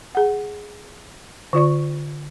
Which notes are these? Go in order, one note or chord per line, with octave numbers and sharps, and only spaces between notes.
G#4 F#5
D3 F4 D5 C#6